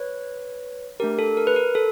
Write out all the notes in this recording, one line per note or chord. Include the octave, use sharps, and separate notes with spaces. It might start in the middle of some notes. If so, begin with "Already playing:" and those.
Already playing: B4 C#5
A3 D4 G4 A#4
A4
A#4
B4
A#4
A4